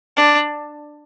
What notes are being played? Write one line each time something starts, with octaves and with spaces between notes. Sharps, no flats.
D4